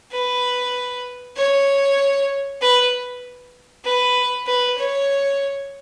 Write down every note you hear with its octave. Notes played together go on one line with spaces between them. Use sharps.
B4
C#5
B4
B4
B4
C#5